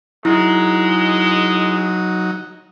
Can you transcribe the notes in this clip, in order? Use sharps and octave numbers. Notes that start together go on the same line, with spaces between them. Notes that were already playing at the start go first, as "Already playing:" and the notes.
F#3 G#3 D#4 E4